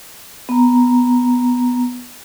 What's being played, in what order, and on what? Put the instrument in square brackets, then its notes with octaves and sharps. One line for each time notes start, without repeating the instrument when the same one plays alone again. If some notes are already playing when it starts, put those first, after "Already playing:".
[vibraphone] B3 A#5